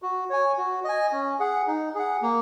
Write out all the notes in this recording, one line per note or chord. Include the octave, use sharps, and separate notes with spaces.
F#4
C#5 G#5
F#4
D#5 G#5
C#4
G#4 F#5
D#4
G#4 F#5
A#3